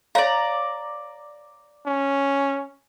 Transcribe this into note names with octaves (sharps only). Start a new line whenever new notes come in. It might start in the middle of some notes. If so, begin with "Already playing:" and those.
C#5 D5 F5 A#5
C#4